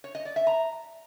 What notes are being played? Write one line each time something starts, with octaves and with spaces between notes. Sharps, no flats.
C#5
D#5
D5
E5
A#5